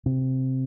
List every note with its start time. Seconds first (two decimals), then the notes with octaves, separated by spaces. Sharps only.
0.06 C3